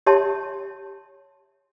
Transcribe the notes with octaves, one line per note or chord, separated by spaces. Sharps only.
G4 C#5 E5 A5 C6